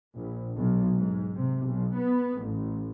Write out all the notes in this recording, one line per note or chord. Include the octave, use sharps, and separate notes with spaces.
A#1
B1
G#2
C3
B1
B3
A1